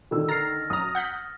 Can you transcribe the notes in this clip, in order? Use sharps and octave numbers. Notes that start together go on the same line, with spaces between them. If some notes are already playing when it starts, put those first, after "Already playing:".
D3 D#3 E6
A#5 F6 A6 A#6 C7
F#2 A#5 D#6
F#5 G6 B6